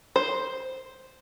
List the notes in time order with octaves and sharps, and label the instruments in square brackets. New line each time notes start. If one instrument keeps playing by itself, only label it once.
[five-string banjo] C5